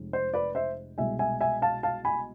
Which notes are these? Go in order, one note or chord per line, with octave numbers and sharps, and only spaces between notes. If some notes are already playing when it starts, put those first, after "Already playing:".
Already playing: F1 G#3
C5
B4 D5
C5 E5
C2 B2 G#3 E5 G#5
E5 G#5
E5 G#5
F5 A5
F5 A5
G#5 B5